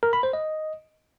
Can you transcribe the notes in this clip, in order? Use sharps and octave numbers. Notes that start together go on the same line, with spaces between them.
A#4
B5
C5
D#5